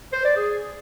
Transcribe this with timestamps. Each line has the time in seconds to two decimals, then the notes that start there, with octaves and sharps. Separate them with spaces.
0.13 C5
0.25 D5
0.36 G#4